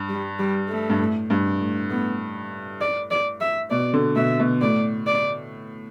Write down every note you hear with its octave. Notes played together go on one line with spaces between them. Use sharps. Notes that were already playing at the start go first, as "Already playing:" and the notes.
Already playing: G2
G3
G3
A3
G2
A2
G2
A2
A2 B3
D5
D5
E5
B2 D5
D3
B2 E5
B2
A2 D5
D5